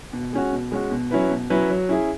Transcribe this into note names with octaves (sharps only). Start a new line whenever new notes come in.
B2
G#3 C#4 F#4
B2
G#3 C#4 F#4
B2
F#3 C#4 E4 B4
B2
F#3 C#4 E4 B4
F#3
C#4 E4 G#4